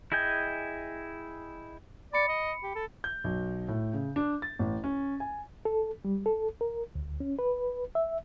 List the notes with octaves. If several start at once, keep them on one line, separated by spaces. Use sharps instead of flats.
E4 G#4 D#5 G5 G#5
D5 B5 C#7
D#5
G4
A4
G6
B1
A2
C#3
D4
A6
A1
C#4
G#5
A4
G3
A4
A#4
D2
C#4
B4
E5